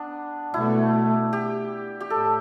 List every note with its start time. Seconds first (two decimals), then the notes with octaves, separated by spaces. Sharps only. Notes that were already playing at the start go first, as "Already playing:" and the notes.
Already playing: B3 D4
0.54 B2 A3 E4
1.33 G4
2.01 G4
2.10 A2 A4